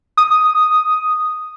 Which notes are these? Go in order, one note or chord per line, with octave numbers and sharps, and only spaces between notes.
D#6